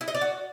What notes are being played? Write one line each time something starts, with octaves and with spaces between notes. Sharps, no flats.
E4
D#5
D5
F#4